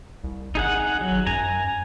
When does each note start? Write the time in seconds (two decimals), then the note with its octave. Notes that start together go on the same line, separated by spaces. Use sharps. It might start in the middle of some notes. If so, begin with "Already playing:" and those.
0.24 C2
0.55 G#1 D#4 G#4 F#5
1.01 F#3
1.26 F#2 G#5 A#5